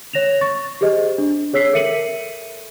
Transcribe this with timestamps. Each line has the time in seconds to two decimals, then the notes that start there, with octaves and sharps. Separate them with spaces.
0.13 C#5 A#6 E7 F7
0.41 C#6 A6
0.81 G4 G#4 C5 D#5
1.18 D4
1.53 G#4 C#5 E6 B6 C7
1.73 A4 A#4 E5 C#7 D#7 F#7